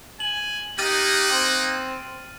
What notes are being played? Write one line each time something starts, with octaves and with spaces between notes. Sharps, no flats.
G#5 F#7
A#3 D#4 G4 F6 F#6 A6 D#7
C4